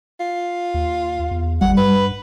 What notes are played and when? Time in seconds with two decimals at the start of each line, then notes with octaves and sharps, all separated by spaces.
0.20 F4
0.74 D#2
1.31 E2
1.61 G#1 G3 F#5
1.77 G2 B4